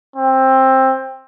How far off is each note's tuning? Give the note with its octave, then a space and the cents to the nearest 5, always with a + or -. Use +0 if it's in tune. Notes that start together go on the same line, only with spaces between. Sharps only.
C4 +15